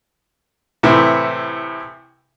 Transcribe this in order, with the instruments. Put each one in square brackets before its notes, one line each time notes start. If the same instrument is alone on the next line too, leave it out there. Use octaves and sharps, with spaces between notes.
[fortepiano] A2 C3 E3 E4